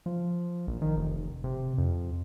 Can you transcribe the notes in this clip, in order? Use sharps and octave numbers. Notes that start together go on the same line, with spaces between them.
F3
A#1
D#3
F1
C3
F2